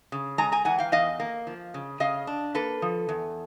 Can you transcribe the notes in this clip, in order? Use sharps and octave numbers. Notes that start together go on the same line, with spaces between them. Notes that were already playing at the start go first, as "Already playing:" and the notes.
C#3
G#3 G#5 A#5
G#5 A#5
E3 F#5 G#5
F5 G5
E2 D#5 F5
A#3
F3
C#3
C#3 D#5 F5
D4
A#3 A4 B4
F3
E2